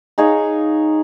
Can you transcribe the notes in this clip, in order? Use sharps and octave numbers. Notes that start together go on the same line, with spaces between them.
D#4 G#4 C#5 F5